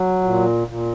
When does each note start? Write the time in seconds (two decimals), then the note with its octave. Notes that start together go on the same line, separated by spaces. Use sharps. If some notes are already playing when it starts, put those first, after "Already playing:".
Already playing: F#3
0.23 A#2
0.68 A#2